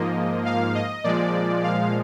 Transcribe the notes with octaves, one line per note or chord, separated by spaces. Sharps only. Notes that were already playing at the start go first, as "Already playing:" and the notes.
Already playing: G#2 F3 A#3 D#5
F5
D#5
A#2 F3 G#3 D5
F5